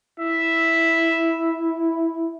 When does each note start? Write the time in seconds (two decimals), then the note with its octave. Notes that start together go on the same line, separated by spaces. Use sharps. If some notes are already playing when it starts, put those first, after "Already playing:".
0.19 E4 E5